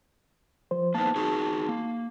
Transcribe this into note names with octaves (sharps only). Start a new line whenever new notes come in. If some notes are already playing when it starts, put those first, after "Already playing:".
F3 C5
A#3 B3 D#4 A5
D#4 F#4 G#4
A#3